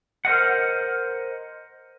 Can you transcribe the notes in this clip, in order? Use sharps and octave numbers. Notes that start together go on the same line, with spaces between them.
A#4 C5 D#5 F#5